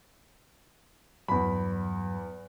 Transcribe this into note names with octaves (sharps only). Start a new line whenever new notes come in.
E2 G2 F#3 B5